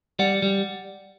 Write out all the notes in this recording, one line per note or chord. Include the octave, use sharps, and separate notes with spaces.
G3 D5 F#5
G3